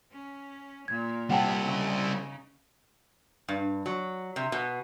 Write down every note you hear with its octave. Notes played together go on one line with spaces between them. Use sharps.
C#4
A#2 G#6
G3 C4 F#5 G5 A5
C#3 D#4
G2
F#3
C3
B2